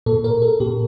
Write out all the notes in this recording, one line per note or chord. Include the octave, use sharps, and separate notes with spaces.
A#2 A4
A#4
A4
A#2 G4